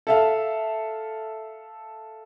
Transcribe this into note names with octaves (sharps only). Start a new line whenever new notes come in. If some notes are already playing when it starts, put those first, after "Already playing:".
A4 E5 F5